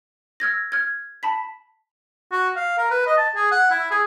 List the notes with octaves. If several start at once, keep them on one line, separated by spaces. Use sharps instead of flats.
E6 F6 G#6 A#6
F6 G#6
A5 B5 B6
F#4
F5
A#4
B4
D#5
A5
G#4
F#5
E4
G#4